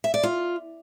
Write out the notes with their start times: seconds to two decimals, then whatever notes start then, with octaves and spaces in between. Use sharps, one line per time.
0.04 E5
0.14 D5
0.23 F4